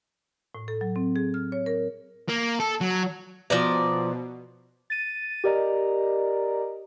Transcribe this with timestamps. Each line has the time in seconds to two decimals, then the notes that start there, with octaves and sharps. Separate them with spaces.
0.55 A2
0.68 A4
0.81 F#3
0.96 C4
1.16 G#4
1.34 F6
1.52 C#5
1.66 A#4
2.29 A#3
2.60 A4
2.81 F#3
3.50 B2 F3 D5 A#5
4.90 A6 D#7
5.44 G4 A#4 D5 D#5 A#5